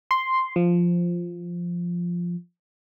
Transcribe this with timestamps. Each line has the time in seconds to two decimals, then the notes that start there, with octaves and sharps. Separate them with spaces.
0.11 C6
0.56 F3